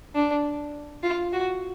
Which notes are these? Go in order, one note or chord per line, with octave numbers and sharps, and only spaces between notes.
D4
F4
F#4